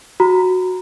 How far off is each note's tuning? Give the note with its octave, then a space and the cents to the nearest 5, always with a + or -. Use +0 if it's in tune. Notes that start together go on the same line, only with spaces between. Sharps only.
F#4 -5 A#5 +0